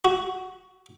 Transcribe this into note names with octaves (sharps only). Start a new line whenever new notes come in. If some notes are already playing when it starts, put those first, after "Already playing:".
F#4